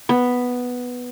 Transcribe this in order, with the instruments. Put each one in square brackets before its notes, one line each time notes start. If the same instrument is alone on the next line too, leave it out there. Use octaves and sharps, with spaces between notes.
[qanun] B3